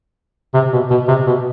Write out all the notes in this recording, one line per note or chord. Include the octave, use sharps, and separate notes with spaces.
C3
B2
B2
C3
B2